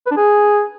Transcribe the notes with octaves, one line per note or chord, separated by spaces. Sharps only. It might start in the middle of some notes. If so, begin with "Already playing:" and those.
B4
D4
G#4